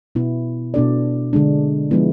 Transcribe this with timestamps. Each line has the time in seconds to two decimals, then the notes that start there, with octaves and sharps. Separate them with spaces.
0.15 B2 B3 E4
0.74 B2 B3 D4 A4 D5
1.33 D3 G#3 D4
1.91 F3 G#3 B3 E4